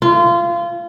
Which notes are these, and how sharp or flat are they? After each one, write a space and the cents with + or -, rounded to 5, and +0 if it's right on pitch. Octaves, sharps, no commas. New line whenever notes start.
F4 -25